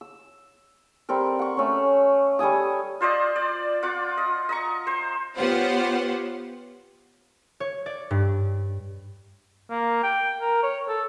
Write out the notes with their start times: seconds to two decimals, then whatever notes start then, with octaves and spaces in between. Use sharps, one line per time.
0.01 E6
1.09 G3 C4 A4 A#4
1.39 F#5 C#6
1.57 A3 C#4
2.39 G3 A4 G#5 D#6
3.01 F4 C5 D5 D#5
3.36 D5
3.83 F4 F#5 D6
4.17 D#5
4.49 D#5 A#5 C#6
4.87 C5
5.36 B3 F4 G4 C5 C#5 F#5
7.60 C#5
7.86 D5
8.11 G2
9.70 A#3
10.03 G5
10.41 A#4
10.63 C#5
10.88 A4